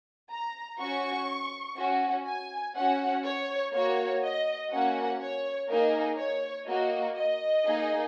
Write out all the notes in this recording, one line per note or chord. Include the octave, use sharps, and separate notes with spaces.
A#5
C#4 F#4 C#6
C#4 F#4
G#5
C#4 F#4 F#5
C#5
A#3 F#4 C#5
D#5
A#3 C#4 F#4 F#5
C#5
A#3 D#4 G#4 A#4
C#5
A#3 F#4 D#5
D#5
A#3 D#4 G#4